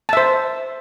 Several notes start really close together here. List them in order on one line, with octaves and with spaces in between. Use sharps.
A5 E5 C5